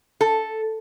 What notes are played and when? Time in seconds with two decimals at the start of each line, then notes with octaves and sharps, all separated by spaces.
0.21 A4